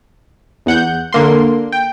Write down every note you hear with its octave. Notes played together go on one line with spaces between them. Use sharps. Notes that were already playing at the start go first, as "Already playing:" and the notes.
E2 F#5 G6
D3 A#3 C6
G5